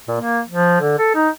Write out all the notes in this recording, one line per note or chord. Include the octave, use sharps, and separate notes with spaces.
A#2
A#3
F3
D3
A4
D#4